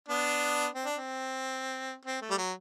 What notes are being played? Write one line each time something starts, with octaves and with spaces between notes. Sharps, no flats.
B3 D4
C4
D4
C4
C4
A3
G3
F#3